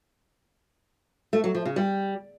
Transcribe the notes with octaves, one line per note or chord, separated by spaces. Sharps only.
A3
F#3
F3
C#3
G3